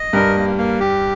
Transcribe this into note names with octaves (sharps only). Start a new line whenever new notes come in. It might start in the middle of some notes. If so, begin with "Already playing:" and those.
Already playing: D#5
G2 G3 A#4
A#3
A#3
G4